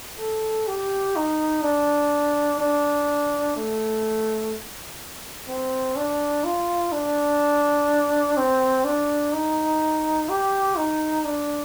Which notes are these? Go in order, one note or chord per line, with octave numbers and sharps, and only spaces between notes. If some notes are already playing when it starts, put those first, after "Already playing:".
A4
G4
D#4
D4
D4
A3
C4
D4
F4
D4
C4
D4
D#4
G4
D#4
D4